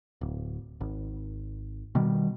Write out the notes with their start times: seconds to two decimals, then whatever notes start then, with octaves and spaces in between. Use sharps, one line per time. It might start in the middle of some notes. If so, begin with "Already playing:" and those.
0.21 D1
0.81 G#1
1.95 B2 D#3 G3